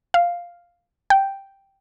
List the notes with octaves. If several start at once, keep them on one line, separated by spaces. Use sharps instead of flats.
F5
G5